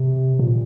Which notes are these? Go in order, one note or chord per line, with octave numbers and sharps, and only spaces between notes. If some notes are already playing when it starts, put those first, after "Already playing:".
Already playing: C3
A#2